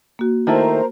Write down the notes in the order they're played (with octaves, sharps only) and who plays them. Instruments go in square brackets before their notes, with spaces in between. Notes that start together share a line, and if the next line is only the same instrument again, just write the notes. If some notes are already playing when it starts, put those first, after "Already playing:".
[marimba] A#3 F#4
[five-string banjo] D#3 A3 E4 [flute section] A#4 C5 A#5 [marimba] A5